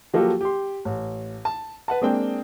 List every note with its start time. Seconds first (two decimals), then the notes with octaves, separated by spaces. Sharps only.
0.13 F3 F#3 A#3 F4 G4 A4
0.41 G4 C6
0.85 A1
1.45 A5
1.88 B4 F#5 A5
2.02 G#3 A#3 C4 D4 G5